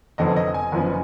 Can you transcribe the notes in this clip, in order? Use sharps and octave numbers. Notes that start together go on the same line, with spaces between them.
F1 F2 D3 F3 B3 D#5
D#5
G#5
F#1 F#2 F3 B3